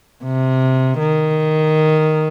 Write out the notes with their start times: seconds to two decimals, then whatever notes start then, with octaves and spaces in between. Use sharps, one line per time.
0.24 C3
0.99 D#3